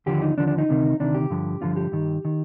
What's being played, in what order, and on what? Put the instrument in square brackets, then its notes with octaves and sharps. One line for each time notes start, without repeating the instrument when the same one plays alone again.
[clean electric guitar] D#2 D3 F3 G4
D#4
D#2 D3 F3 D4
D4
D#4
D2 C3 D#3
D2 C3 D#3 D4
G4
G2 D3 F3
G2 D3 F3 F4
G4
G2 D#3
D#3